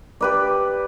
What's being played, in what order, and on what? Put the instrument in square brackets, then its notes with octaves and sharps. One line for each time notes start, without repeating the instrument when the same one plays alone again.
[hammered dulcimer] G4 B4 D5